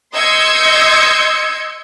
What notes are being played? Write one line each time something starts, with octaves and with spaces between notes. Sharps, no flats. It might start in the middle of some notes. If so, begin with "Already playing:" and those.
D#5 C6 E6 G6 G#6 C#7